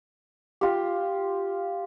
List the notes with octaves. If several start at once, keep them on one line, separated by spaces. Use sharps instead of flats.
F4 G4